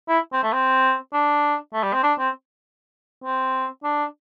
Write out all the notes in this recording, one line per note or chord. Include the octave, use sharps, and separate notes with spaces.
E4
C4
A3
C4
D4
A3
G3
C4
D4
C4
C4
D4